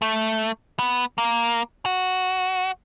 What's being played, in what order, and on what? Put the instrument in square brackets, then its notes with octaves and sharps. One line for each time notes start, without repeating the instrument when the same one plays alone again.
[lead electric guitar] A3
B3
A#3
F#4